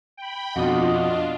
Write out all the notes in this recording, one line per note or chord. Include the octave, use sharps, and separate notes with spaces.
G5 B5
F2 B2 D4 F4 F#4 D#5 D#6